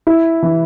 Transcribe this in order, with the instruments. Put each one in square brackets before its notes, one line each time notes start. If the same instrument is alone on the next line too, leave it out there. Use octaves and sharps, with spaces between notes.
[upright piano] E4
E3